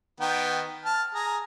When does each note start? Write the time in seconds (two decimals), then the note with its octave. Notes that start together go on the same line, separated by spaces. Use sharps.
0.20 D#3 B3 G5
0.85 A5 F6
1.15 G#4 A#5